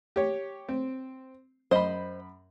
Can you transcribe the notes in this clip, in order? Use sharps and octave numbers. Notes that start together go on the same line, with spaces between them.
G4 C#5
C4
F#2 C5 D#5 B5